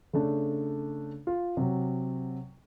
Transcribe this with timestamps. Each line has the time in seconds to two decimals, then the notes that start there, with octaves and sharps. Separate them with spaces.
0.13 C#3 A3 D4
1.27 F4
1.57 C3 F#3